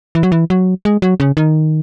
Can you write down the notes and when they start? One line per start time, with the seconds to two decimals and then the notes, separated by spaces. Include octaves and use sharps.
0.15 E3
0.23 F#3
0.32 E3
0.50 F#3
0.85 G#3
1.02 F#3
1.20 C#3
1.37 D#3